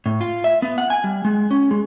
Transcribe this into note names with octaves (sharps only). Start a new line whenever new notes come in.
A2
F4
E5
B3
F#5
G#5
G3
G#3
C#4
G#3